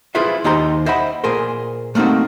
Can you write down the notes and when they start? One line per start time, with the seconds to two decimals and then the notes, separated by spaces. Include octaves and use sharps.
0.15 E4 F4 G#4 B4 C5 E5
0.44 D#2 D#4 G4 C5 A#5 C6
0.86 C5 D#5 E5 F#5 B5
1.24 A#2 G#4 A#4 C5
1.95 A3 A#3 C4 D#4 F#4